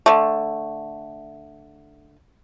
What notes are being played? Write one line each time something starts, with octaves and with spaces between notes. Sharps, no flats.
D3 A3